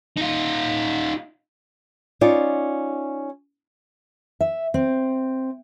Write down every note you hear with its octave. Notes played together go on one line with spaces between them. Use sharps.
D#4 F4
C#4 D#4 F4 D5
E5
C4